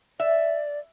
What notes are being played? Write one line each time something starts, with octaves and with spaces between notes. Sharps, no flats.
D5 E5